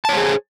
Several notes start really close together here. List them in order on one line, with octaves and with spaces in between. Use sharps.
A5 C#5 C5 G#4